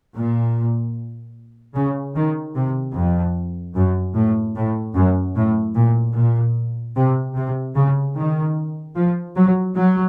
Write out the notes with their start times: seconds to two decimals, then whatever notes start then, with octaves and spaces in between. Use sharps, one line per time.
0.15 A#2
1.75 C#3
2.15 D#3
2.55 C3
2.95 F2
3.75 F#2
4.16 A2
4.56 A2
4.95 F#2
5.36 A2
5.75 A#2
6.16 A#2
6.96 C3
7.36 C3
7.75 C#3
8.16 D#3
8.96 F3
9.36 F#3
9.76 F#3